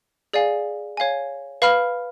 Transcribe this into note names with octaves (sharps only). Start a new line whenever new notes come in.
G#4 D5 F5 G#5
C#5 F5 G#5
B4 F5 B5 F6